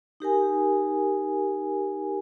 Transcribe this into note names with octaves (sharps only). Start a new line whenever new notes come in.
D#4 G4 A#4 G#5